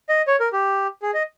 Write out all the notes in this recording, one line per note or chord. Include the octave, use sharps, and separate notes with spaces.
D#5
C#5
A#4
G4
G#4
D#5